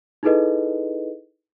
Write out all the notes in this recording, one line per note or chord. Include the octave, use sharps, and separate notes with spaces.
D#4 E4 G#4 A4 B4 D#5